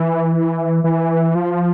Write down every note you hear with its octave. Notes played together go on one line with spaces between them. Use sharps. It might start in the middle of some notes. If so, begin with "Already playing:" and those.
Already playing: E3
E3
F3